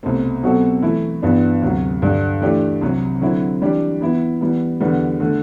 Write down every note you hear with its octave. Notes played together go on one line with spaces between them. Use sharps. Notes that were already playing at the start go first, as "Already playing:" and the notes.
C2 B2 A3 C4
B2 F#3 C4 F#4 A4
E3 A3 E4
G2 E3 B3 D4
D2 C3 F#3
G2 D3 G3 D4
E3 A3 D4 G4
C2 C3 F#3
D3 F#3 C4 E4
E3 G3 D4 G4
E3 B3 E4
E3 G3 B3
E2 D3 G3 B3
D3 A3